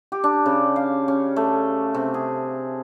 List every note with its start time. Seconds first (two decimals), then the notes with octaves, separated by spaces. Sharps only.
0.12 G4
0.24 D4
0.46 C#3
0.76 F5
1.08 C#4
1.36 A3
1.94 C3
2.14 G#4